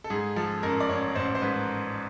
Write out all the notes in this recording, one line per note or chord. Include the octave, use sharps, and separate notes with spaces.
A4
G#2 G#4
F3 A4
A1 A#4
D5
A1 C#5
A1 C5
C5
G#2 B4